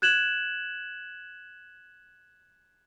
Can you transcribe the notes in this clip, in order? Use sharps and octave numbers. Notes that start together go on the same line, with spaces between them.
F#6 G#6 E7 F#7